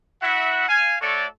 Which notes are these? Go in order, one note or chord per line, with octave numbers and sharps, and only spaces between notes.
E4 F#4 E5 F#5
F5 G#5
A3 F#4 A4 C#5 D5